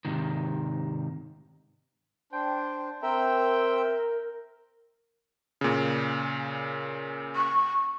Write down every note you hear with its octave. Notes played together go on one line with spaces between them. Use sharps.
G#2 C3 D#3
D4 C5 G5
C4 A#4 E5 G5
A#2 C#3
C#6